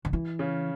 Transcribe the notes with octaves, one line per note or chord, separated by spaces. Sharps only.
D#3
E3
C#3 C#4